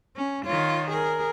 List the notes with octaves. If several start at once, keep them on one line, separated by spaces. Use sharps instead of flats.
C#4
D#3 F4 C#5
G#4 A#4